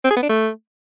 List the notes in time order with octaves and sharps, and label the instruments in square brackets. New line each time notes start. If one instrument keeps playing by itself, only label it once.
[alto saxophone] C4
G#4
B3
D4
A3